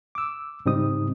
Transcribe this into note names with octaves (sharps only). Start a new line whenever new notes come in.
D6 E6
G#2 C#3 G3 C4 D#4 D#6